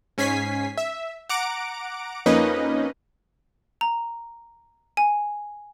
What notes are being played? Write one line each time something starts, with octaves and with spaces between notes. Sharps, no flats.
G#2 C#4 G#5 B6 C7
E5
F#5 A#5 D6 D7
F2 A#3 C#4 D#4 B4 D#5
A#5
G#5